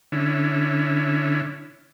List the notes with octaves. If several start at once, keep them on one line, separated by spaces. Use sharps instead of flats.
D3 C#4 E4